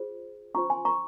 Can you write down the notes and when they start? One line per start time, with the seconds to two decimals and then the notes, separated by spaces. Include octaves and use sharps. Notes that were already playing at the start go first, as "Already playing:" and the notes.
Already playing: F4 G#4 C5
0.55 C#4 F4 C5 A#5 C#6
0.70 G#5 C6
0.85 A#5 C#6